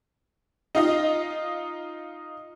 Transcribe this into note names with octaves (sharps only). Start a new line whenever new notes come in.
D#4 F4 D#5